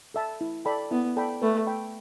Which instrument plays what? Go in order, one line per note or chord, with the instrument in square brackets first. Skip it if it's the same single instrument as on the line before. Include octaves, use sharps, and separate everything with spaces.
[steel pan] A4 E5 A5
E4
A4 D5 G5 B5
[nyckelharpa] B3 [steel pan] E4
[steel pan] A4 D5 G5 B5
[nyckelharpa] A3 [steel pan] B4
[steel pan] E5 G5 B5